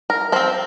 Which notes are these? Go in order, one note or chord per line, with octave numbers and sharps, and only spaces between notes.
A#4
F3 C4 C5